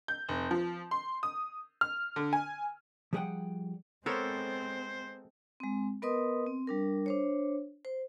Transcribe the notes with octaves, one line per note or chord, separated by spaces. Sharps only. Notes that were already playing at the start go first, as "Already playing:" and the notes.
G6
F1
F3
C6
D#6
F6
D3
G#5
F3 G3 G#4 A#4 F#5 G5
G#3 B3 C4 A4 A#4 C5 C#5
G#3 C4
B3 A#4 B4 D#5 C6 D#6
C4
G3 D4 A#4
D4 C5 C#5
C5